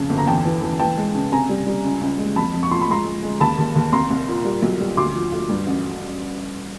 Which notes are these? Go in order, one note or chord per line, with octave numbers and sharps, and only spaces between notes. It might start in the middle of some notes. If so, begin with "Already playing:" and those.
Already playing: F2 C#3 A5
G1
A#5
E2 G5 A5
E3
E3
E3 G5 A5
G#3
C#3
C3 G#5 A#5
G3
G3
C#2
C#2
G#3
F2 A5 B5
F2
C#6
F3 C6
B5
G#3 A#5 C6
G#3
G#3
D#2 A5 B5
D#2
D#2
C2 A#5 C6
C2
A#2
G3
B1
G3
D2 C6 D6
F3
D2
G2
A1